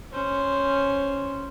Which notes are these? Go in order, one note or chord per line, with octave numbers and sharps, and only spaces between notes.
C#4 C5